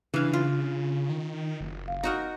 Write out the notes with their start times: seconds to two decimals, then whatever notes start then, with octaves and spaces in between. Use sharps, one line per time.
0.14 C#3 E3 D4 F5 F#6
0.33 F4
1.09 D#3
1.61 F#1
1.88 F5
2.04 D#4 F#4 A#4